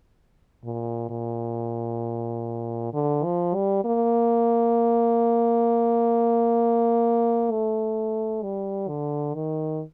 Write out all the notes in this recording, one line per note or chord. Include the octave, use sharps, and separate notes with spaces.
A#2
A#2
D3
F3
G3
A#3
A3
G3
D3
D#3